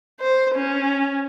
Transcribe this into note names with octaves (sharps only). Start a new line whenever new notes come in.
C5
C#4